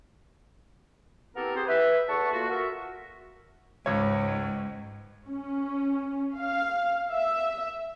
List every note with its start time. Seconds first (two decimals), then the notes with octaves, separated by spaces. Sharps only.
1.35 B3 C4 E4 G4 A4 A#4
1.56 G4 G#4 C5
1.67 B4 E5
2.08 E2 A4 F#5 A5 C#6
2.31 A3 A#3 F4 F#4
2.48 F#4 A#4 E5
3.86 C#2 G#2 C#5
5.29 C#4
6.38 F5
7.13 E5